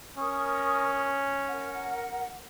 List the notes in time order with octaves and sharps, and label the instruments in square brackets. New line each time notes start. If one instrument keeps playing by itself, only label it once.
[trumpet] C#4 [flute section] A#4 C#6 D#6
[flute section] A#4 F#5